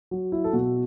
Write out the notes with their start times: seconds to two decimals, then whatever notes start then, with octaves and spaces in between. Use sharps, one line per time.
0.11 F#3
0.32 E4
0.44 A4
0.53 B2 F#4